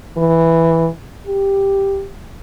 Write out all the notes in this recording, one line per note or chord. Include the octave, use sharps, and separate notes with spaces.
E3
G4